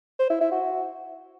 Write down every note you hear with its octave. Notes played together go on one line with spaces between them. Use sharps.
C5
E4
E4
F#4